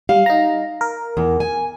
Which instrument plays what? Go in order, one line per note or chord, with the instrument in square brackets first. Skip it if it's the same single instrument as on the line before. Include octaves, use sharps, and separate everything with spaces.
[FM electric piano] G3 [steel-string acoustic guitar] F5
[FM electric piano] D#4 A#5
A#4
[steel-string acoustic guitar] E2
G#5